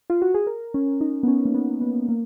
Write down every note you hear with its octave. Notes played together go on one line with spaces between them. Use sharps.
F4
F#4
G#4
A#4
C#4
D#4
B3
C#4
A#3
B3
B3
A#3